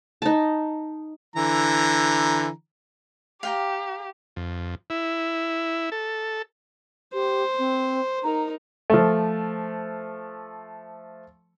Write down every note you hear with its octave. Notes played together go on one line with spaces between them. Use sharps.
D#4 A5
D3 E3 A#5
G4 F5 G5 A#5
F2
E4
A4
G4 C5
C4
D#4 A#4 A#5
F3 A3